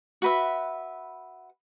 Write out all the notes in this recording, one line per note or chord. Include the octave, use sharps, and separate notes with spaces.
F#4 B4 E5